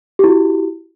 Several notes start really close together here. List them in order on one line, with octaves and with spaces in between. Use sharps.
G4 E4 F#4